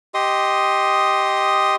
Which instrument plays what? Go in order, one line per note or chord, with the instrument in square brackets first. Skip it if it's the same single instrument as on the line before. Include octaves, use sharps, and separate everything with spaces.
[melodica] G4 D#5 C6 D#6